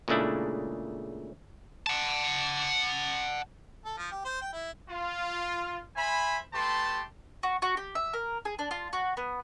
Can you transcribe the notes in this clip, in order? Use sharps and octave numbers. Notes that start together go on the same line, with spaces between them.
A#2 C#3 G#3 A3 D4 E4
F#5 A5
A4
F3
G4
C5
G5
E4
F4
C5 E5 G#5 B5
A3 G4 B4 A5 C6
F#4
F#4
G4
E5
A#4
G#4
D4
F4
F#4
B3